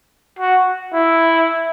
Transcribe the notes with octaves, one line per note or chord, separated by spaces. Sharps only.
F#4
E4